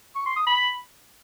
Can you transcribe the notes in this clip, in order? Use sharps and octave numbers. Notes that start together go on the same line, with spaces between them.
C#6
C6
D#6
B5